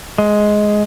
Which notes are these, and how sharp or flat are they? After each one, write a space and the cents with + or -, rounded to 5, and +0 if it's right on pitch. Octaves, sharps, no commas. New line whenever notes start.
G#3 +10